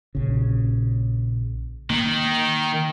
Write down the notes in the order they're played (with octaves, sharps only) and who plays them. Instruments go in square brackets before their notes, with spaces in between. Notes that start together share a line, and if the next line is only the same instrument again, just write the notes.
[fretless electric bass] A#1 C#3
[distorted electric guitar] D#3 [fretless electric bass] A#3